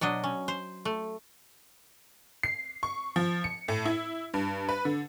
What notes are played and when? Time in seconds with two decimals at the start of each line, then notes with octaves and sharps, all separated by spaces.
0.01 B2 F#3 D4 D#5
0.24 C#4
0.48 C5
0.85 A3
2.43 C7
2.83 C#6
3.16 F3
3.44 C#7
3.68 A2
3.86 E4
4.34 G2
4.69 B4
4.85 D3